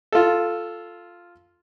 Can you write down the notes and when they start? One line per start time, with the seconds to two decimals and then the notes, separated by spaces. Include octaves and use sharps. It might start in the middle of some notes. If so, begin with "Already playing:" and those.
0.13 F4 A4